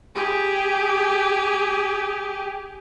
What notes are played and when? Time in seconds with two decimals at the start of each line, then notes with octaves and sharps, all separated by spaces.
0.15 G4 G#4